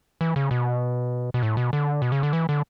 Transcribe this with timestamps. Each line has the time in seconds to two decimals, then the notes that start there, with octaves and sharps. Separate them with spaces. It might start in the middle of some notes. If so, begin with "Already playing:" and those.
0.21 E3
0.36 C#3
0.51 B2
1.34 B2
1.43 A2
1.57 B2
1.73 D3
2.02 B2
2.12 C#3
2.23 D3
2.33 E3
2.49 D3